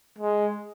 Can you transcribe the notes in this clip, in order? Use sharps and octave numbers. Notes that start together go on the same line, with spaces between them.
G#3